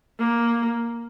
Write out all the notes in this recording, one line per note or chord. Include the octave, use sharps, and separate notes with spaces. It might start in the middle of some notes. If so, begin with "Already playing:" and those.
A#3